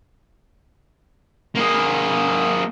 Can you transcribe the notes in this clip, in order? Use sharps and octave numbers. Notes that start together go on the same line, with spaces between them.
A#3 G#4